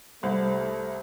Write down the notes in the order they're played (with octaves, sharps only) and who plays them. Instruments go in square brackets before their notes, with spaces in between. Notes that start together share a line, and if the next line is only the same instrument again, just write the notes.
[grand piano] C2 [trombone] A3 [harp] C5 B5